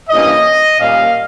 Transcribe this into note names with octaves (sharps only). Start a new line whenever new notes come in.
G2 E3 G3 A#3 C#4 D#5
A#2 G3 A#3 C#4 F5